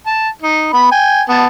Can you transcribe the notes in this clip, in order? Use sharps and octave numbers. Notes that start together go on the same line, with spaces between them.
A5
D#4
B3 B5
G5 G#5
B3 A5